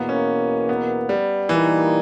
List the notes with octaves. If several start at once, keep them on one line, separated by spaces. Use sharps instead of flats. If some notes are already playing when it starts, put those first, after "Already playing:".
Already playing: E2 B2 A#3 B3
C#4
B3
G3
A#2 E3 G3 A#3 D#4